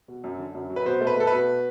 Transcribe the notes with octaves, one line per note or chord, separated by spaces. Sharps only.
B2
F#2
D3
F#2
F#3
B4
B2 C5
A3
B4
A3 A4
B2 B4